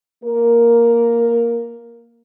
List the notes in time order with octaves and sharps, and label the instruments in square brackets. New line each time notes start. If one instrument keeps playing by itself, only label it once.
[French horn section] A#3 A#4